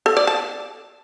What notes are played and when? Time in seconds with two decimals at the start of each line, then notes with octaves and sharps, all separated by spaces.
0.06 A4
0.17 D5
0.27 A5